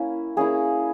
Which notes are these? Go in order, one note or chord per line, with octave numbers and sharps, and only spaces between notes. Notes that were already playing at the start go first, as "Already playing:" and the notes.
Already playing: A#3 C#4 E4
A#3 C#4 E4 G#4